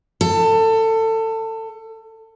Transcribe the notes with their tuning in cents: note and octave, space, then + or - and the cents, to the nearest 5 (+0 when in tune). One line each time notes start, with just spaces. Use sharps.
A4 +25